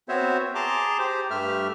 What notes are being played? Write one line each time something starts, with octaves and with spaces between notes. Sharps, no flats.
B3 C4 F#4 C5 C#5 E5
G#4 A5 A#5 C6 D6
G4 C5
G2 A3 G4 E5 F6